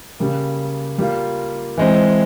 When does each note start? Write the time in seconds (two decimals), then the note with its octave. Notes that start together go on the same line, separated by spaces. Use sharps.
0.20 C#3 G3 A#3
0.98 G3 A#3 F4
1.78 E3 G#3 C4